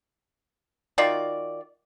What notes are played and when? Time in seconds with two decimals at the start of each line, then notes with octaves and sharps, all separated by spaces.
0.98 D#3 F4 F#4 D5